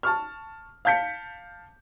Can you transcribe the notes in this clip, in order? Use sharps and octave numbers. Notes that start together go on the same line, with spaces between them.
A5 C#6 F6
F5 A5 G6 B6 C#7